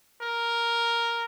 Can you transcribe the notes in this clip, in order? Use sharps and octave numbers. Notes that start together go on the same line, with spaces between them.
A#4